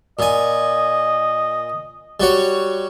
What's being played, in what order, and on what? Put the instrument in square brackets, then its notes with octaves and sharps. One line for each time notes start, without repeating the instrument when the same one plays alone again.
[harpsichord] A#2 G#5 [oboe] D#5
[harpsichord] G3 F#4 C#5